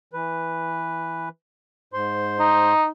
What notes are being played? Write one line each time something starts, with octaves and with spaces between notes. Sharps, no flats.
E3 B4
G#2 C5 C6
D#4